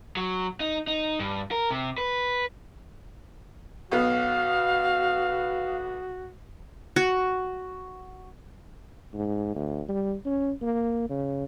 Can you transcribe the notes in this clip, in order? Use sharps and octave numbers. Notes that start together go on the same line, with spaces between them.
F#3
D#4
D#4
G2
A#4
C3
B4
B1 B3 F#4 F5
F#4
G#2
D2
G3
C#4
A#3
C#3